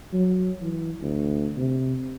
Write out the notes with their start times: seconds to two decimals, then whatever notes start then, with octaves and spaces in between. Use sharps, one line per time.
0.13 F#3
0.62 E3
1.02 D2
1.57 C3